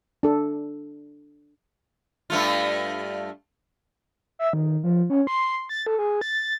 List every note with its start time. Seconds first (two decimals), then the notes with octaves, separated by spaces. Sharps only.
0.23 D4 A4
2.30 G2 A3 F4
4.39 E5
4.53 D#3
4.84 F3
5.10 C#4
5.27 C6
5.69 A6
5.87 A4
5.99 G#4
6.21 A6